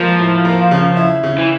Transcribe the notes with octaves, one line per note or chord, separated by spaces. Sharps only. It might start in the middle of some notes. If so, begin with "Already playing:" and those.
Already playing: F3 G#3 A#3
A2
A#3
C#3
E4
C#3
E3